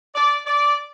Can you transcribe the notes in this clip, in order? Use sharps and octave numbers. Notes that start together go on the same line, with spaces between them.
D5
D5